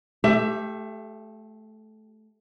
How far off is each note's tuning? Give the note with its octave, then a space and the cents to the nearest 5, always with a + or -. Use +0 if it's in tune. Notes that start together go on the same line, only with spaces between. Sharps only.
A3 -20 G4 +0 E5 +25